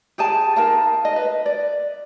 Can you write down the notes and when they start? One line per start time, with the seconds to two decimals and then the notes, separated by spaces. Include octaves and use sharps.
0.18 G4 G#4 G#5 A5
0.56 D#4 A#4 F5 A5
1.05 D#5
1.16 B4
1.46 D5